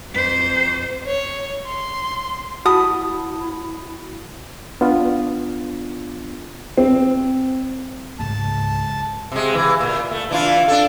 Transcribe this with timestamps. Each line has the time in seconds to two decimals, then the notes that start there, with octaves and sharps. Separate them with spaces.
0.11 F2 C5
1.06 C#5
1.66 C6
2.66 E4 F#4 A5 B5 D#6
4.81 B3 D4 F4
6.77 C4
8.19 C#2 G#2 A5
9.32 C3 G#3
9.55 E3
9.81 A#2
10.11 A3
10.31 E3 D4 F4
10.68 D4 A4